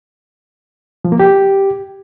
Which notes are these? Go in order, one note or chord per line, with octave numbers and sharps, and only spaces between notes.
F3
A#3
G4